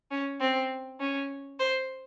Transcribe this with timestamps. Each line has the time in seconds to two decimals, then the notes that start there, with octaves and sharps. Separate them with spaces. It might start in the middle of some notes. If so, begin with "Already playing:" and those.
0.11 C#4
0.40 C4
0.99 C#4
1.59 C5